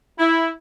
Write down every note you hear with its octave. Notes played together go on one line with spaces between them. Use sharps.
E4